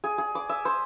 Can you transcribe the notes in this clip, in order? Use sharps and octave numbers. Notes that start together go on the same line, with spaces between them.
G#4
G#4
D6
E5
C5